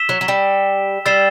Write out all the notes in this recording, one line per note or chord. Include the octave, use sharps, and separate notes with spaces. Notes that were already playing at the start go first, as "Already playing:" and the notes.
Already playing: E6 B6 E7 G7
F#3
F#3
G3
G3 E6 A6 C7 E7 G7